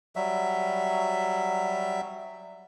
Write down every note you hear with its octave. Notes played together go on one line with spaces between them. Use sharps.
F#3 G3 E5